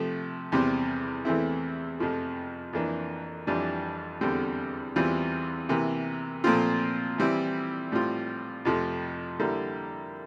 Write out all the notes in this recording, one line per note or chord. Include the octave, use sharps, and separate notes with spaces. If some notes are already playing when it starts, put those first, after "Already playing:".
Already playing: C3 F3 A3
E2 C3 G3 C4
E2 E3 A3 C4 E4
F2 C3 F3 A3
F2 E3 A#3 D4
F2 E3 G3 D4 F4
E2 D3 G3 C4
E2 E3 G3 C4 F4
C3 E3 A#3
A#2 F3 A3 C4 F4
E3 G3 C4 E4
A2 G3 C4 F4
F2 C3 F3 A3
D3 G3 A#3 E4